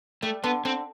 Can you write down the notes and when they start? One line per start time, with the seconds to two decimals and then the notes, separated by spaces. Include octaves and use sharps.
0.22 G3 A3
0.44 D3 B3
0.65 D3 C4